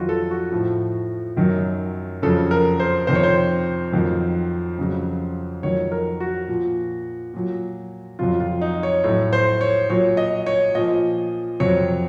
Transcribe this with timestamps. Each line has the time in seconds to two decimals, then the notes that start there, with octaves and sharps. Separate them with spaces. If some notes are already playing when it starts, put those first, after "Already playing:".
Already playing: F2 D#3 F#3 F4 F#4
0.09 A4
0.31 F#4
0.52 A2 F3
1.37 F#2 D#3 F#3
2.22 F2 C#3 F#3 A4
2.51 A#4
2.80 C5
3.07 F2 C3 D#3 C5
3.15 C#5
3.23 C5
3.92 F2 D#3 F#3
4.78 F2 C#3 F#3
5.63 F2 D#3 F#3 C#5
5.92 A#4
6.20 F#4
6.48 A#2 F3
7.34 A#2 F#3
8.19 F2 C3 F#3 F4
8.40 F4
8.61 D#4
8.83 C#5
9.04 A2 F#3 C#5
9.33 C5
9.61 C#5
9.90 A#2 F#3 C#5
10.17 D#5
10.46 C#5
10.75 A#2 F3 D#5
11.60 F2 C3 F#3 C#5